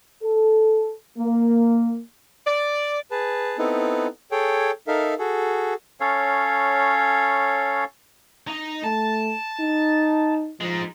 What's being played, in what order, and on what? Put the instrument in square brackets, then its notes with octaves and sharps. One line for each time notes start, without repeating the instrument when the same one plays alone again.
[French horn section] A4
A#3
[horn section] D5
[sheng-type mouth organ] G#4 B4 A5
B3 C4 D#4 E4 A4 B4
G#4 A4 C#5 G5
D#4 A4 A#4 E5 F5
F#4 G#4 A4
[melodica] C#4 A4 C#5 F5
[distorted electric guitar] D#4
[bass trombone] A3 [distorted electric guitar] A5
[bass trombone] D#4
[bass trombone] F3 [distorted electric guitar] G#3 D#4